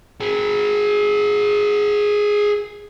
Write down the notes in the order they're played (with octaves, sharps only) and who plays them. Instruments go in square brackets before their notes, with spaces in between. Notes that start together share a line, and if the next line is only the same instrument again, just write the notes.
[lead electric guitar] G#4 A#4